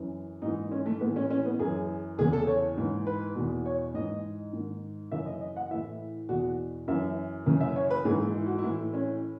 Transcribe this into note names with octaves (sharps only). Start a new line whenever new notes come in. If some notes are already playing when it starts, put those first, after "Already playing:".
Already playing: F#2 E3
G#2 E3 D#4
C#4
A3
A2 E3 B3
C#4
C#4
B3
F#2 E3 G#4
E2 C#3 E3 G#4
A4
C#5
G#2 E3
B4
E2 B2
C#5
G#2 E3 D#5
G#2 D#3
F#2 C#3 E3 E5
D#5
D#5
F#5
A2 E3 E5
E2 B2 F#4
F#2 E3 E5
F#2 C#3 E3
E5
C#5
B4
G#2 E3 G#4
E4
E4
F#4
E4
A2 E3
C#4